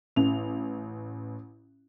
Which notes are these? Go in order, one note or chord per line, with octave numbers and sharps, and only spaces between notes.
A1 F7